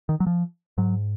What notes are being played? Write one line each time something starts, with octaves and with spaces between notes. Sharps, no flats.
D#3
F#3
F3
G#2 F#3